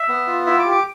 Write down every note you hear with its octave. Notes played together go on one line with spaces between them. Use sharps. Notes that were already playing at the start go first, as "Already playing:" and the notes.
Already playing: E5
B3
F4
E4 E5
D6
G4
D6